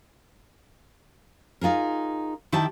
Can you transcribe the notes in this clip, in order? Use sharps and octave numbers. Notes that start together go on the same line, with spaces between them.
D#4 F4 G#4 A#4
D#3 E4 G4 A5